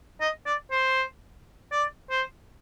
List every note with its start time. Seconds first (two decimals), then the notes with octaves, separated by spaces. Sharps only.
0.21 D#5
0.46 D5
0.71 C5
1.72 D5
2.10 C5